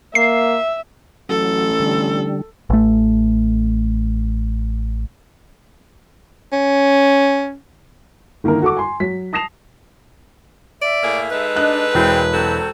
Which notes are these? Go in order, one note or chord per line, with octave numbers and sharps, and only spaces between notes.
A#3 E5 C7
A1 F#3 A4
D3 G3
A1 A3
C#4
D3 D#3 A#3 E4 A#4
F#4 A4 C#6 D6
G#5 C6
F#3 B6
A5 D#6 A#6 C7 E7 F7
D5 E5
A2 A#3 G#4
G#3 D#4 A4 B4
D4 D#5 F#6
E1 G#3 C4 E4 G5
F#3 C4 A4